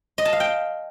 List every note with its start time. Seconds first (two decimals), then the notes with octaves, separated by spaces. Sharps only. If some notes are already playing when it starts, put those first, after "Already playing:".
0.18 D#5
0.25 A5
0.33 F5
0.40 G5